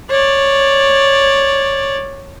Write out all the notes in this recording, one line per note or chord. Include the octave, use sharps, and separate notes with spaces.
C#5 D5